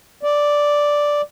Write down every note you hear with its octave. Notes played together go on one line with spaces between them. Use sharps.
D5